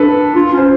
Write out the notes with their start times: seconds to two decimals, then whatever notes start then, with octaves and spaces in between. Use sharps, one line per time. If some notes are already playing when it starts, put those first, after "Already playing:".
Already playing: D4 A4 B4
0.35 F4
0.53 C#4 C5